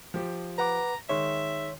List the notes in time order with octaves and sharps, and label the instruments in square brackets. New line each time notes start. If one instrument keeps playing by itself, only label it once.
[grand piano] F3 G4
[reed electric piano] B4 F#5 D6 [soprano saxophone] A#5
[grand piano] D#3 G#3 [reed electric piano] C#5 C6 [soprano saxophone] E5